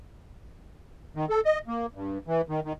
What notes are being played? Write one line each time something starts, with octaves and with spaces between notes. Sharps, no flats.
D#3
A4
D#5
A#3
G2
E3
D#3
D#3